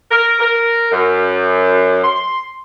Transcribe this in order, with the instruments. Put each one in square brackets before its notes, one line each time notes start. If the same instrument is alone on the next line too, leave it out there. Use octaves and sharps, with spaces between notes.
[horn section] A#4
A#4
F#2
C6